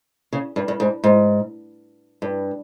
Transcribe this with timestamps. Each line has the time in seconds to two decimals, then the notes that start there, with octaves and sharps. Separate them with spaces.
0.33 C#3
0.56 G2
0.68 G2
0.80 G#2
1.04 G#2
2.22 G2